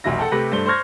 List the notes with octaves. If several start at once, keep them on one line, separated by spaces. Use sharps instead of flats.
F1 B1 E3 F#3 E4 A#6
A4 F#5 G5 A5
C3 A3 G4 B4 A#6 F#7
G2 A3 C5 G7
C5 C6 C#6 F6 G#6 A#6